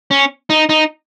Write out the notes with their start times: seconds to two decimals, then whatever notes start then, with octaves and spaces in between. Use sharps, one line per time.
0.11 C#4
0.50 D#4
0.69 D#4